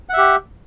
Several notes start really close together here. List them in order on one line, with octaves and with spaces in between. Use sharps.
F#5 E5 G4